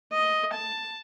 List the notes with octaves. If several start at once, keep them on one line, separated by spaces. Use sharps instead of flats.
D#5
A5